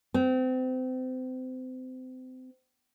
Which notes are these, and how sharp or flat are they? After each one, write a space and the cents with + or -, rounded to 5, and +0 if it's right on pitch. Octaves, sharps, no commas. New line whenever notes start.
C4 -30